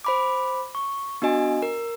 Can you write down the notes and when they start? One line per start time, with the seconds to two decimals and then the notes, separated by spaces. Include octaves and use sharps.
0.05 C5 B5 D6
0.75 C#6
1.22 B3 D4 F#4 D#5 G#5
1.62 A#4